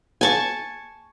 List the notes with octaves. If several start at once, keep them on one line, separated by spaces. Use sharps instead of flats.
G#5 A5 C#6